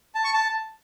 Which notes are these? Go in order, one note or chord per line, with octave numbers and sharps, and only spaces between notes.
A5
C#6
A5